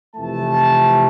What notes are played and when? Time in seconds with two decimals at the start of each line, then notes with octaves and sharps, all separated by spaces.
0.16 F2 C3 E3 A3 A5